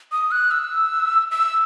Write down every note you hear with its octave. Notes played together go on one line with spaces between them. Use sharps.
D#6
F#6
E6
E6